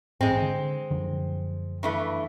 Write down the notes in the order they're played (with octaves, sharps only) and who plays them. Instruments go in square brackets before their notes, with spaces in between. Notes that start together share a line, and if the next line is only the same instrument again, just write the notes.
[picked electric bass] A1 G#2 [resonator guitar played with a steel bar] G#3 C4
[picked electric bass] D3
F#2 D3 F3
[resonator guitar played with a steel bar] G2 E3 A3